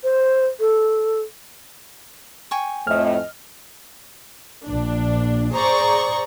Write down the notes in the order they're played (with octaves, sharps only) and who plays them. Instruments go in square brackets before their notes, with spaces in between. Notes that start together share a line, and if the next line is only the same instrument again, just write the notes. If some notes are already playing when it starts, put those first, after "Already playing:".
[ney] C5
A4
[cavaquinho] G5 G#5 C#6
[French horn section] F2 A2 [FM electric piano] D#5 F6
[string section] A#1 D4
G#4 C5 D5 A#5 C#6